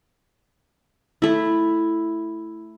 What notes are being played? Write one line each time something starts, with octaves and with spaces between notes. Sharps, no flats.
A3 E4